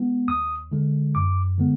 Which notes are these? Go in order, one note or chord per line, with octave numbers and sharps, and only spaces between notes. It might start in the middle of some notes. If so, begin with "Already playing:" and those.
Already playing: G#3 B3
D#2 D#6
D3 G#3
F#2 D6
D3 G#3 B3